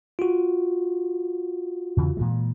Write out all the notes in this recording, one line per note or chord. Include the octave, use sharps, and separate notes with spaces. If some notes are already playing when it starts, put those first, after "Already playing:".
F4 F#4
E2 C#3 E3
A#2 E3 G#3